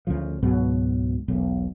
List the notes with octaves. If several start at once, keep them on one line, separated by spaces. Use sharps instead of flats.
D2 C#3 F3
C#2 G#2 B2 F#3
E1 B1